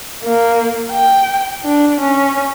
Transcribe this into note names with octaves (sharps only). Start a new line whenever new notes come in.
A#3
G5
D4
C#4